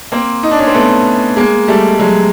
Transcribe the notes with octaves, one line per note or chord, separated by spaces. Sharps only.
A#3 C4
D#4
D4
C#4
C4
A3 B3
G#3 A#3
G3 A3
F#3 G#3